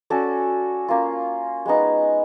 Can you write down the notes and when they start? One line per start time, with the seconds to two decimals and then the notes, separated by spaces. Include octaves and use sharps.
0.10 C#4 F#4 A4 D5
0.88 A#3 C#4 F4
1.66 G#3 B3 D#4